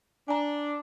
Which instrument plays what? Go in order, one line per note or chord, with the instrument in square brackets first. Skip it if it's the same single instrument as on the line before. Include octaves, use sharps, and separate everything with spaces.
[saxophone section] D4 [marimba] G#5 A#5